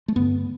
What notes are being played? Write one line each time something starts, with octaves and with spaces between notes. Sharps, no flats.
A3
G2 D3 B3